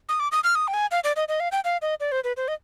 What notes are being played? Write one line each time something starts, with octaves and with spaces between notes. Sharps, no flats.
D#6
D6
D#6
F6
D#6
G5
G#5
F5
D5
D#5
D#5
F5
G5
F5
D#5
D5
C5
B4
C5
D#5